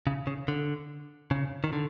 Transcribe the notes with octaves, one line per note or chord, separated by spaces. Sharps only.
C#3
C#3
D3
C#3
D#3
D3